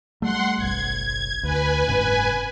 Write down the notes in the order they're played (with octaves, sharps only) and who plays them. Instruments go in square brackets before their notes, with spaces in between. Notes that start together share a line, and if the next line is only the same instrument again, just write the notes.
[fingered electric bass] G3 A3 [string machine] F#5 C6
[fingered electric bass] F#1 B1 [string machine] G#6
[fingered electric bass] D2 [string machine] B4 G#5
[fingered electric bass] F#1 G#2 C3